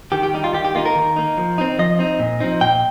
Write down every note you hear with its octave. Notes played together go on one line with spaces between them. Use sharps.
D#3 G4
G4
G3 D#4 G4
F4
D#3 G4
G4
A#3 D#4 F4
A#4
D#3
A#3 D#4
F3
C4 D#4
F3 D#5
C4 D#4
A#2
F3 C4 D#4
A#2 G5